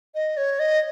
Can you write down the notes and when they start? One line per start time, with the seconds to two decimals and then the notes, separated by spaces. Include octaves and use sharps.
0.15 D#5
0.37 C#5
0.59 D#5